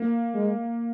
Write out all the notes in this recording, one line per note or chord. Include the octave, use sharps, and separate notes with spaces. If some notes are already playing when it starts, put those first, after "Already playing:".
Already playing: A#3
G#3